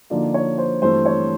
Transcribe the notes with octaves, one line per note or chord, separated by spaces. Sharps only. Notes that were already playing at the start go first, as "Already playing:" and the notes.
D3 F3 A#3 D#4 D5
C#5
C5
G2 E3 A3 C4 C5
C#5